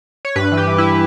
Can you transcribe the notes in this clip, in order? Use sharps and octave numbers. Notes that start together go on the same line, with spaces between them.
C#5
G2 B4
E3
G4
E3
E4